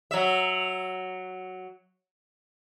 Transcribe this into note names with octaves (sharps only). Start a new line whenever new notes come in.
F#3 E5